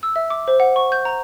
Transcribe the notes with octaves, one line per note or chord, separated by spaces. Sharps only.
E6
E5
D6
C5
F#5
C#6
G6
A#5